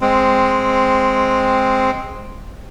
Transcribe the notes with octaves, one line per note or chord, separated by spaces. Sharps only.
G#3 C4